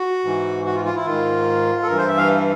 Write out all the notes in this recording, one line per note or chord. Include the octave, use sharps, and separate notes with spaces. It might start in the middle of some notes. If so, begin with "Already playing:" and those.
Already playing: F#4
G#2 E3
F#4
F4
F4
E4
G#2 D#3 F4
A4
G2 E3 A#4
C5
E5
F5